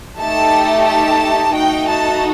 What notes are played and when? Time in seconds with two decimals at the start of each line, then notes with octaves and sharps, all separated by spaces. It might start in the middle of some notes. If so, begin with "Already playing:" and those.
0.19 A3 D#4 G4 A5
0.86 A5
1.54 A3 D#4 F#4 G5
1.88 A5